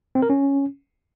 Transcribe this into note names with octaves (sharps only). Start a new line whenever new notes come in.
C4
A#4
C#4